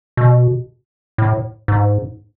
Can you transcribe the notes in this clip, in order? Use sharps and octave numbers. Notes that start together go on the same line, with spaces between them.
B2
A2
G#2